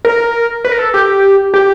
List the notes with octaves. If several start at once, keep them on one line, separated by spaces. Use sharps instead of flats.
A#4
B4
A#4
A4
G4
G4